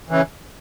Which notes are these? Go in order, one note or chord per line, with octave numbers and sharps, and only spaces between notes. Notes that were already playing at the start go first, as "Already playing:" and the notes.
C#3 E3